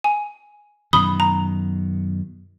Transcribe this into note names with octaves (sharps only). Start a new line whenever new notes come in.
G#5
F#2 B2 D#3 B5 D#6 G7
A#5